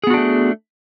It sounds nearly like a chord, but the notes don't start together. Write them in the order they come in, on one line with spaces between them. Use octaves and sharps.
G#4 B3 F#4 D4 A3